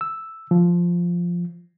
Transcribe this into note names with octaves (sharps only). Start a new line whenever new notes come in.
E6
F3